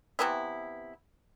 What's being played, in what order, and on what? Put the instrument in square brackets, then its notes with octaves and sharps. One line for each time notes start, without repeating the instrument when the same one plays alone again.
[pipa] C3 E3 B3 E4